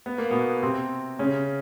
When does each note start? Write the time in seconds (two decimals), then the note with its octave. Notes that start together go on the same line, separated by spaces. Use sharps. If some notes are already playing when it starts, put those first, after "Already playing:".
0.06 B3
0.18 A#3
0.31 B2 B3
0.63 C3 C4
1.19 C#3 C#4